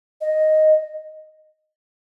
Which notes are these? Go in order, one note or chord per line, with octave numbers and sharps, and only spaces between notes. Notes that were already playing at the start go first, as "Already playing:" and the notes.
D#5